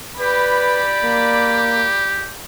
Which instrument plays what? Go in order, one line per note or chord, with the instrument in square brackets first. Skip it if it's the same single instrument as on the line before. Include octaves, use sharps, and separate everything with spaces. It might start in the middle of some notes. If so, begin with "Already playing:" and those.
[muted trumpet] G4 [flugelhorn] B4 [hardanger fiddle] D5 B5
[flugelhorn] A#3